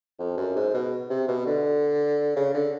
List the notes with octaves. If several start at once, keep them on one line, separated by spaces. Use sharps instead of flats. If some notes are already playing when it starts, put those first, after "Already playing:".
F2
F#2
G#2
B2
C3
B2
D3
C#3
D3